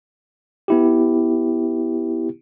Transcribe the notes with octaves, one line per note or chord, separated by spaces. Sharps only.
B3 E4 G4